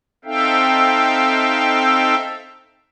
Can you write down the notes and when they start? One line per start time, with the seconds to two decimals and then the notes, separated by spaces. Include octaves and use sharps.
0.25 C4 D#4 A4 E5 F5 G5